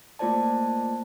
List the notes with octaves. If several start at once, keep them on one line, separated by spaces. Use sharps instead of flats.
A3 A#3 F4 C5 D5 A5